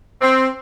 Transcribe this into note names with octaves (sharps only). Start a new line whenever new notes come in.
C4